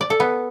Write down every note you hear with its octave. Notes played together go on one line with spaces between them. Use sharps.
D5
A4
B3